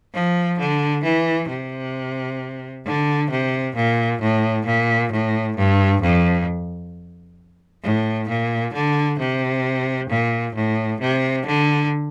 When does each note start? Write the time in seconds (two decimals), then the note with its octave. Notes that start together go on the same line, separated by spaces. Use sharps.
0.14 F3
0.59 D3
1.04 E3
1.49 C3
2.85 D3
3.30 C3
3.76 A#2
4.21 A2
4.66 A#2
5.11 A2
5.57 G2
6.02 F2
7.83 A2
8.28 A#2
8.74 D3
9.19 C3
10.10 A#2
10.55 A2
11.00 C3
11.46 D3